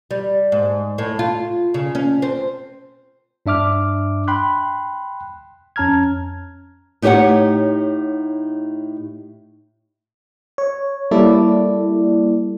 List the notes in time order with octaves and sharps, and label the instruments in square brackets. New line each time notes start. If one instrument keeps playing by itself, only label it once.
[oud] G3
G#2
A2
F4
C#3
C#4
C4
[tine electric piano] G2 D4 E5 D6 F6
G5 B5 C6 F#6
F2 C#4 A5 A#5 F6 G#6
[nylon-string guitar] A2 D#4 G4 C5 C#5 F#5
[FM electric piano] C#5
G3 A#3 E4 A4 D5